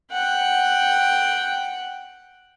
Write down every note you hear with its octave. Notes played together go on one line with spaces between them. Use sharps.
F#5 G5